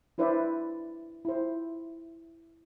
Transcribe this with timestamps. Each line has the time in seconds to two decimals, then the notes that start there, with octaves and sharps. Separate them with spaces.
0.18 D4 E4 B4 C5 D5 E5
1.25 E4 C5